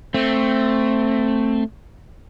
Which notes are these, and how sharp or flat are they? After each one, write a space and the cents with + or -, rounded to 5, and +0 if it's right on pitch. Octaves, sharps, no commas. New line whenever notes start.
A3 +10 C4 +0